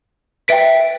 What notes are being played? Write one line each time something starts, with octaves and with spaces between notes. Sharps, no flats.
B4 E5 G5 B6 D7